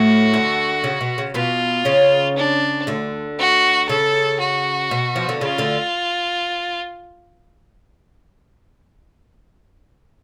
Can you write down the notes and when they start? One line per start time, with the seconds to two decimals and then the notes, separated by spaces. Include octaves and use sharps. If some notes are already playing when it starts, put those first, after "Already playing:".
Already playing: A2 A3 F#4
0.33 D2 D3
0.84 C#3
1.01 B2
1.18 C#3
1.34 B2 B3 F4
1.85 C#3 C#4
2.37 D4
2.87 D2 D3
3.38 F#4
3.89 C#3 A4
4.40 F#4
4.91 B2
5.16 F3
5.29 D3
5.41 C#3 F4
5.58 D2 D3